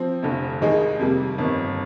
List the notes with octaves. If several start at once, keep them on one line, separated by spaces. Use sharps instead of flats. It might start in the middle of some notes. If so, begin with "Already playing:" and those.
Already playing: F3 C4
F1 F2 D3
D#2 D#3 G#3 D#4 G#4
F2 C3 G3 A#3
G1 F2 D#3